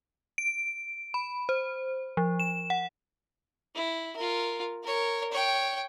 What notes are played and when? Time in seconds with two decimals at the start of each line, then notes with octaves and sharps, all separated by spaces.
0.38 D7
1.14 B5
1.49 C5
2.17 F3
2.40 E7
2.70 F#5
3.75 E4
4.16 F4 A#4
4.83 A#4 C#5
5.32 C#5 G5